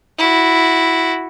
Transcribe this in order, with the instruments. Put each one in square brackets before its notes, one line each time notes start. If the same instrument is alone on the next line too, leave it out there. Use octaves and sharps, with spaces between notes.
[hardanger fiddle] E4 F#4